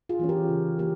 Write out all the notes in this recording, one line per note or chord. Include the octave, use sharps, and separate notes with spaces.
F4 G#4
E3 A#3 C#4
G4 A#4
C#3
E3 A#3 G4 A#4